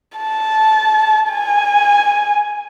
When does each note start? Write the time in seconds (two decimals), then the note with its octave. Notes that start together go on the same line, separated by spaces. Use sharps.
0.18 A5
1.30 G#5